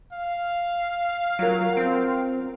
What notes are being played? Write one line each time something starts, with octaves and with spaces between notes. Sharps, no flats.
F5
F#3 F4 A#4
C4